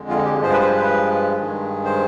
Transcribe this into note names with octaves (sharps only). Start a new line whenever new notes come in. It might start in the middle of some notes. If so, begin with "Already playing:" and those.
Already playing: F2 D3 G#3
F4
G4
G2 F3 G#3 C5
B4
C5
B4
B4
G2 D#3 G#3
C5